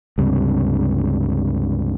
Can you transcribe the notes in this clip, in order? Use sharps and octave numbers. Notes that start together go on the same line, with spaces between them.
C#2 G2 C3